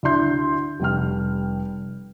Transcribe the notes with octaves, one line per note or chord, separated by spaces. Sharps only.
D2 E4 D5 E5 C6 G6
F1 G3 G5 F6